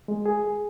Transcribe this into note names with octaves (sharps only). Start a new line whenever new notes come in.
G#3
G#4
G#4